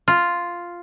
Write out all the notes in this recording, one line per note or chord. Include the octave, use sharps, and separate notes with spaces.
F4